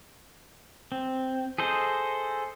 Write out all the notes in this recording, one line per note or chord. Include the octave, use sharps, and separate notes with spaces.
C4
G#4 A4 C5 D#5